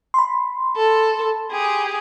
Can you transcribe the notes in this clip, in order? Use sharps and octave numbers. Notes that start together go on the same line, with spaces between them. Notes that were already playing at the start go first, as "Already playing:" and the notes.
B5 C6
A4
G4 G#4